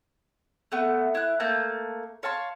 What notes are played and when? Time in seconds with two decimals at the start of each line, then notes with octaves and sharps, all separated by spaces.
0.72 A3 B3
1.15 E4 F#6
1.40 A3 A#3 A5 G6
2.23 C#5 F5 A5 C6